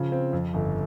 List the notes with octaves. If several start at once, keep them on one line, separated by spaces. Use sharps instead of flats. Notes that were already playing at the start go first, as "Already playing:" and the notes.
Already playing: C#3 F3
C4
F2
G1